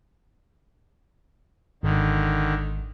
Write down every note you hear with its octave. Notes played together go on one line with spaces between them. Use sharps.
G#1 D3 D#3